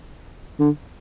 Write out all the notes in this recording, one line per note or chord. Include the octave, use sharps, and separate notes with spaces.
D3